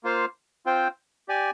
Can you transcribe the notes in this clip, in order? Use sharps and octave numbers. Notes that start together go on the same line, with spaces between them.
A#3 F4 C5 F5
C4 F4 C5 G5
G4 D5 G#5